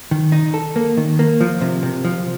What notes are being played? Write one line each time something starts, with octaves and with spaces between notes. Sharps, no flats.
D#3
D#4
A4
A#3
D#3
A#3
F3
C3
C3
F3